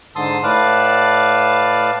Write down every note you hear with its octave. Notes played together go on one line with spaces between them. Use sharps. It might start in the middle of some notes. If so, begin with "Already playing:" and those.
G#2 D3 A5 C6 D#6 E6
A2 B4 D5 F5 A5